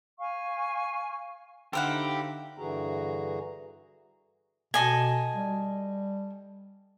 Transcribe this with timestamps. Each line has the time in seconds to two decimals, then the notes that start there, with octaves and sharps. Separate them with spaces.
0.19 F5 G#5 C#6
1.73 D3 D#4 E4 G4 A4 C5 F5 F#5
2.58 G2 D3 E3 F#4 G#4 A#5
4.74 B2 A4 D#5 G#5
5.34 G3